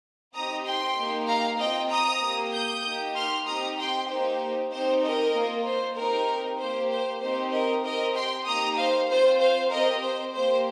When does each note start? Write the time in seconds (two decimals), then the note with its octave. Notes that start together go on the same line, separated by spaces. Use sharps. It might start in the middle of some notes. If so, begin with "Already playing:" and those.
0.34 C4 D#4 G4 A#5 D#6
0.65 G5 C6
0.97 A#3 D#4 G4
1.28 F5 A#5
1.59 C4 F4 D#5 G5
1.90 A#5 D#6
2.21 A#3 G4
2.53 D#6 G6
2.84 A#3 D#4 G4
3.15 C6 F6
3.46 C4 D#4 G4 A#5 D#6
3.78 G5 C6
4.08 A#3 D#4 G4 C5
4.71 C4 D#4 G4 C5
5.03 A#4 D#5
5.33 A#3 F4
5.65 C5
5.96 C4 D#4 G4 A#4
6.58 A#3 G4 C5
6.90 C5
7.21 C4 D#4 G4 C5
7.52 A#4 D#5
7.84 C4 G4 A#4 D#5
8.15 G5 C6
8.45 A#3 D#4 G4 A#5 D#6
8.77 C5 F5
9.09 C4 F4 C5
9.39 C5 F5
9.70 C4 G4 A#4 D#5
10.01 C5
10.33 A#3 G4 C5